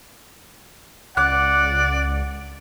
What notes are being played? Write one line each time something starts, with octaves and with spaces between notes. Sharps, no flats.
C#2 D5 F#5 D6 F#6